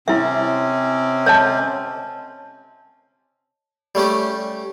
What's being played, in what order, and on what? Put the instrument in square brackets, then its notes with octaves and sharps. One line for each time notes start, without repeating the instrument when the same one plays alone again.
[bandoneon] C3 C4 C#4 [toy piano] E4 E5
[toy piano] C#5 D#5 A5
[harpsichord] G3 A3 C#4 G4